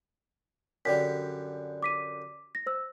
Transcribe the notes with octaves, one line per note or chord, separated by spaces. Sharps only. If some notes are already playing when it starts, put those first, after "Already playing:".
F#2 D3 G3 B6
D6 B6 D#7
A#6
C5 E6